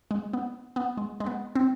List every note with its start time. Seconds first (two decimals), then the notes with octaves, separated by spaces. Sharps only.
0.11 G#3
0.33 B3
0.76 B3
0.97 G#3
1.20 G#3
1.26 B3
1.55 C4